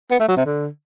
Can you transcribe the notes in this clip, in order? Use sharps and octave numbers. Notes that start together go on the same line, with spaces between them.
B3
A3
F#3
C3
D3